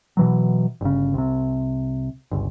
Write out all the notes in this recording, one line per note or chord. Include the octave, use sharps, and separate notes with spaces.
B2 E3 F#3
G1 C#3
C2 C3
G1 C#2